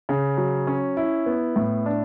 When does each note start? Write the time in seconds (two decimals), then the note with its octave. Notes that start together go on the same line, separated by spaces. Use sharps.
0.09 C#3
0.37 F#3
0.67 C#4
0.97 E4
1.26 B3
1.56 A2
1.86 D4